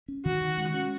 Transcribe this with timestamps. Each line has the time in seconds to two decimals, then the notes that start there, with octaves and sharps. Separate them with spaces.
0.08 C#4
0.25 D#3 F#4
0.41 D#3
0.58 G#3
0.74 C#4